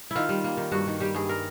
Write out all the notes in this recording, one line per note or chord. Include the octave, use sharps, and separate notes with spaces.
D#3 E4 F4
G3
A#3
D#3
G2 F#4
D#3
G3 G4
G2 G#4
A#4